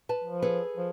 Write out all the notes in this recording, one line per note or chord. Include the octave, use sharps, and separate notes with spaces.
B4 A5
F3
G#4 A4 B4
F3